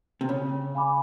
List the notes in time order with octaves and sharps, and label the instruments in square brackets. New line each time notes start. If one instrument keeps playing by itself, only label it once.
[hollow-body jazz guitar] C3
[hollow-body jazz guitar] C#3 [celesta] C#5
[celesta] F5 G#5 B5 D6